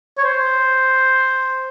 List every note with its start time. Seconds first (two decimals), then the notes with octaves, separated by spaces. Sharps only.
0.18 C#5
0.24 C5